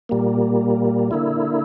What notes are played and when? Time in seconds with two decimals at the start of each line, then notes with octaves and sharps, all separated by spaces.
0.09 A#2 G3 A#3
1.11 D3 A#3 E4